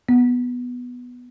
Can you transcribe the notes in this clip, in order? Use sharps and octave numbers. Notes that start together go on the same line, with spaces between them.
B3